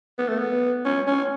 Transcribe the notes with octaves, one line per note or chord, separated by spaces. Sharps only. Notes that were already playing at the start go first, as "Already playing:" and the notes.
B3
A3
B3
C#4
C#4